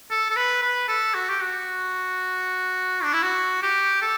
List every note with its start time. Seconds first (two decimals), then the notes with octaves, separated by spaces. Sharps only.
0.11 A4
0.31 A4
0.37 B4
0.62 B4
0.88 A4
1.14 F#4
1.30 G4
1.41 F#4
3.04 D4
3.13 E4
3.23 F#4
3.63 G4
4.02 A4